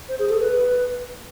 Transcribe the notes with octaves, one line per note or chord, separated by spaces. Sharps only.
C5
G#4
A4
B4